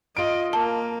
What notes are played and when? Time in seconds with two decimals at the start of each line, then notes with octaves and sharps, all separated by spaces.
0.17 F4 D#5 D7
0.53 A#3 A5